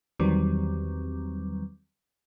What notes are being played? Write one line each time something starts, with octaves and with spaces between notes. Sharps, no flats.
E2 D#3 F#3 G3 C4